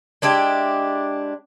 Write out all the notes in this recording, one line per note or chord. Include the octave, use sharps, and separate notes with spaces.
G#3 D4 E4 G4